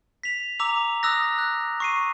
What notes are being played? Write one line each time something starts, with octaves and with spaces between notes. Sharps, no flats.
B6 F7
A#5 D6 E6 F7
D#6 E6 F#6 A#6
F#6
C#6 C7 D#7